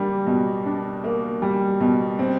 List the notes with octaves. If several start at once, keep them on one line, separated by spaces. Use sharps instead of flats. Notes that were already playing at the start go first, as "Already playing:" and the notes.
Already playing: G3 A#3 D4
B2
D4
A#3
G3
B2
C4